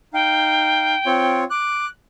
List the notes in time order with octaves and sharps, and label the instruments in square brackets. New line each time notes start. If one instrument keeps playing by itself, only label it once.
[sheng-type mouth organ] D#4 F5 [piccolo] G5
[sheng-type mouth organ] C4 F4 C#5
[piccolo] D6 [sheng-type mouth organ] F#6